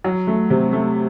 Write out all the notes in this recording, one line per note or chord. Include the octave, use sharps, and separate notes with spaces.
F#3
A3
C3
A3